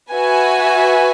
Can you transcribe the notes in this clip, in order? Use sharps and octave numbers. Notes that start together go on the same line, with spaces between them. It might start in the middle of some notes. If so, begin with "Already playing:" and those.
F#4 B4 E5 G#5